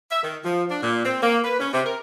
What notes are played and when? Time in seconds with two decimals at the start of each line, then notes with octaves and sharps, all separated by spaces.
0.10 E5
0.23 D#3
0.45 F3
0.70 D4
0.82 A#2
1.04 C4
1.22 A#3
1.44 B4
1.59 C#4
1.73 C3
1.85 A#4